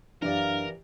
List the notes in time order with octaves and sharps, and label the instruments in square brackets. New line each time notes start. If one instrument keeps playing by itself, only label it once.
[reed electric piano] F#2 D4 [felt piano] E3 G4 D5 [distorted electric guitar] A#4 [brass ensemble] F5